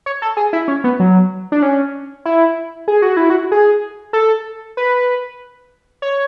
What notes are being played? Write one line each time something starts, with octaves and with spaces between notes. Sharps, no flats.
C#5
A4
G#4
E4
C#4
B3
F#3
D4
C#4
E4
G#4
F#4
E4
F#4
G#4
A4
B4
C#5